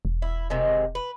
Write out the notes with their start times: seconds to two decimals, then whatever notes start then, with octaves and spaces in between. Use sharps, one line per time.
0.05 E1
0.22 E4
0.50 C3 D#3 G#3
0.95 B4